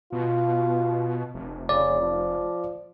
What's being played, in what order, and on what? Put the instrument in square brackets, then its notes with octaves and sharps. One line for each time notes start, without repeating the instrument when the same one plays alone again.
[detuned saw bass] B2 [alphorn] F4
[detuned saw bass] F1
[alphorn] C#3 [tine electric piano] D5
[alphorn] F3